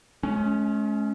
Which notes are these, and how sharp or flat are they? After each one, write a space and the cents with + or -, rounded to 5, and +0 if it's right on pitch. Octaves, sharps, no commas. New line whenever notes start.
G#3 +45 C#4 +0